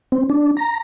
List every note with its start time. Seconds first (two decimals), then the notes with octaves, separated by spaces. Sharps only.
0.12 C4
0.30 D4
0.57 A#5